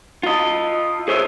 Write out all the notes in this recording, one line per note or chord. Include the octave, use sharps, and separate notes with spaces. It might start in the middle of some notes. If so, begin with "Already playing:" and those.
F4 D#5
G#4 C5 C#5 E5